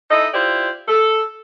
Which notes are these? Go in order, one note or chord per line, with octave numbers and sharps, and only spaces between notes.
D#4 E4 A4 D#5
E4 F4 G4 C5 D5
A4